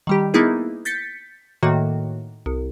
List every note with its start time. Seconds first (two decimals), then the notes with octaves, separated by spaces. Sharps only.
0.07 D#3 G3 G4
0.34 A#3 B3 D#4 E4 G#4
0.85 G6 A6 B6 C#7
1.63 A2 D#3 A#3 F#4
2.46 C2